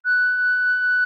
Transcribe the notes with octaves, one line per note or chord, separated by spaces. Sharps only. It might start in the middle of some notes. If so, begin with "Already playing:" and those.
F#6